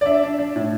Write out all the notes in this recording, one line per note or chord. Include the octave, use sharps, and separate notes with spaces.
D5
D4 E5
D4
D4
A2